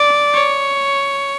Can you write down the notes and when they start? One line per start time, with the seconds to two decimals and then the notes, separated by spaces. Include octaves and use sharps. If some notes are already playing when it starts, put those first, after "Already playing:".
Already playing: D5
0.34 C#5